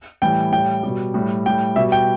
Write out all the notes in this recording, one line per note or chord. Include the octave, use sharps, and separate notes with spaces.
A2 E3 G3 G5
A2 G3 G5
B2 G3
A2 G3
A2 G3 G5
B2 G3 E5
G5